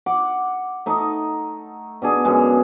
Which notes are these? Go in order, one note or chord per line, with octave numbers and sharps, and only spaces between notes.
F#5 D6
A3 D#4 D#5
B2 D4 G#4
F#2 B2 G#3